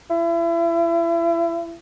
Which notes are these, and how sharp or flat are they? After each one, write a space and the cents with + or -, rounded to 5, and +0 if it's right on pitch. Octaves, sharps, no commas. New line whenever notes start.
E4 +35